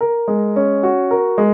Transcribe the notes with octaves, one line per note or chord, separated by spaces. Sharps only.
A#4
G#3
C#4
F#4
A#4
G#3